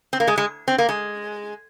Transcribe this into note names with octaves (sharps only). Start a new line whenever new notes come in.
C4
A#3
G#3
G#3
C4
A#3
G#3